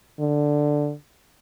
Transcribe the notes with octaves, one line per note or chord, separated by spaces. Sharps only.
D3